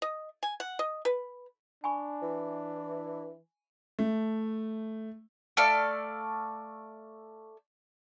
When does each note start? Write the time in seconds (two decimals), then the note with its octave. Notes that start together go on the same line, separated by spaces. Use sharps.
0.02 D#5
0.43 G#5
0.60 F#5
0.79 D#5
1.05 B4
1.84 D4 G#5 B5 C#6
2.22 E3
3.99 A3
5.57 A3 A4 D5 F5